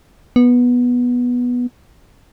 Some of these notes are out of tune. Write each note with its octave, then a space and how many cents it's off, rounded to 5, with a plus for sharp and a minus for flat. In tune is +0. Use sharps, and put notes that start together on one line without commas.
B3 -10